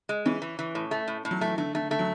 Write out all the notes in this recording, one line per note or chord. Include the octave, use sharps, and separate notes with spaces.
G#3
E3 C#4
E3
E3
A2
A3
A2
A2
F#3
E3 A3
D3 A3
D3 A3
D3 A3
F#3